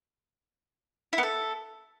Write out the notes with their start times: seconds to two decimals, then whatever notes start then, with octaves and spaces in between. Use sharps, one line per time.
1.13 E4
1.18 B3
1.23 A4